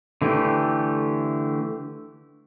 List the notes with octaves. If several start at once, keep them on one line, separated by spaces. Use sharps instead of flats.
D3 E3 A3 G4